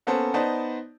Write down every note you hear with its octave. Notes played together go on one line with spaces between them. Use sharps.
A#3 B3 C#4 A4 C5
B3 D#4 C5 D5 A5